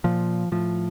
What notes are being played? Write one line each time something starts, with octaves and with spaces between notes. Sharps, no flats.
A#2 F3
A2 F3